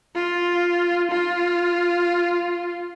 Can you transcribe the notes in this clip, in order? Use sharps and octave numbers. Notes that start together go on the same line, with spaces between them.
F4
F4